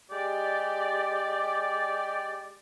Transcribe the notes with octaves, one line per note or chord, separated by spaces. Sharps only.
G#3 G4 D5